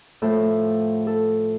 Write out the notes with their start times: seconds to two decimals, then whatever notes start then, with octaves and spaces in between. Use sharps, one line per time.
0.22 A2 F3 A4
1.07 A4